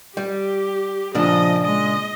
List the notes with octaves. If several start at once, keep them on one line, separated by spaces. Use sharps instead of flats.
G3 G4
A#2 C#3 F3 D4 D#5
G#3 D#5